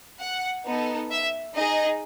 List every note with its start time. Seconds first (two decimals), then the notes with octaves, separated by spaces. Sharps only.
0.20 F#5
0.65 B3 D#4 A4
1.11 E5
1.55 D#4 G#4 D#5